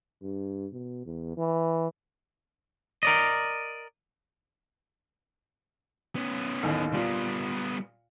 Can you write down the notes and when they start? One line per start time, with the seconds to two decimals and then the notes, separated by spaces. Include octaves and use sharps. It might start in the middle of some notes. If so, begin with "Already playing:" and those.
0.22 G2
0.73 B2
1.06 E2
1.38 E3
3.03 A#4 D5 D#5
6.16 B3 C#4
6.63 A1 D#2
6.94 A#2 G3 B3 F4